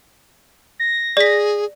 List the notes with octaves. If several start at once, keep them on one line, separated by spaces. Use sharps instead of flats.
A#6
G#4 D5 B6